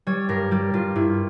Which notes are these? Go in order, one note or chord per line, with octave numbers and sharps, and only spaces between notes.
G3 C#5
G2 A#4
G3 G4
G2 F4
G2 E4